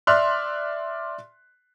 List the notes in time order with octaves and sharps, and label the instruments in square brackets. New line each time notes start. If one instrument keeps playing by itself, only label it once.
[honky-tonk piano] D5 E5 C6 F6 F#6